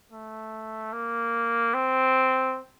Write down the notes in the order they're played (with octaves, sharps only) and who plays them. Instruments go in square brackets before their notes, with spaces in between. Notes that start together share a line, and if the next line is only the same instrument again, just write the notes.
[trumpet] A3
A#3
C4